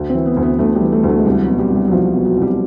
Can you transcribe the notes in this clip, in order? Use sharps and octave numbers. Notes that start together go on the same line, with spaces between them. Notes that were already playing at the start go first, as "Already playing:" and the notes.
Already playing: D2
C4
E3
B3
D2
B3
D2 A3
G3
E3
A3
D2
A3
G#3
C2 G3
F#3
B2
G3
C2
G3
F#3
C2 F3
B2
F#3
C2 G3